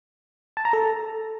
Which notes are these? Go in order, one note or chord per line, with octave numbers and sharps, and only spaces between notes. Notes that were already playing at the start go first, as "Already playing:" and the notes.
A5
A#5
A4